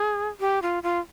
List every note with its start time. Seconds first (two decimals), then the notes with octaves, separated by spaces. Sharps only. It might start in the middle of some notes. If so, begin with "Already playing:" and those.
Already playing: G#4
0.40 G4
0.62 F4
0.83 F4